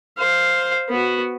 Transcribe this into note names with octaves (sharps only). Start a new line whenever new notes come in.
C5 F5
B3 F#4